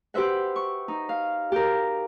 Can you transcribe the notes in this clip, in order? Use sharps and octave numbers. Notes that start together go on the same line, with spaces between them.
G4 B4 C5 E5 F#5
C#6
D#4
F5
G4 A#4